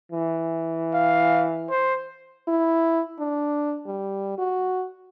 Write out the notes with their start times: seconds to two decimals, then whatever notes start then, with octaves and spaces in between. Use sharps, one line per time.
0.12 E3
0.94 F5
1.70 C5
2.48 E4
3.19 D4
3.87 G3
4.39 F#4